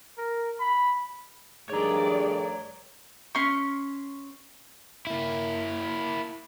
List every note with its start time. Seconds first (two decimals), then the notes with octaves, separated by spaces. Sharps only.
0.18 A#4
0.60 B5
1.70 G2 D#3 A3 G#4 C#5 D5 A#5
3.35 C#4 C6 C#6
5.07 A#3 E4